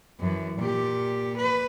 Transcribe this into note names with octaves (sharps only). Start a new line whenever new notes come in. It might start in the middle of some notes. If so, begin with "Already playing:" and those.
F#2 E3
A#2 G4
B4